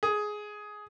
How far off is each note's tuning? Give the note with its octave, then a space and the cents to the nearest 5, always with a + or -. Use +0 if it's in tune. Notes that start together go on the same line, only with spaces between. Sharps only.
G#4 +10